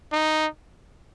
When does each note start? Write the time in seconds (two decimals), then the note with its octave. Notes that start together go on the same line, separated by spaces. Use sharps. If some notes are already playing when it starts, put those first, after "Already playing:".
0.12 D#4